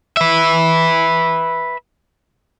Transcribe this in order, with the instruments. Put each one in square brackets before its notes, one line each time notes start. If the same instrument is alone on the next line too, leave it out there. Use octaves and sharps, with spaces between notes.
[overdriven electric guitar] B4 E5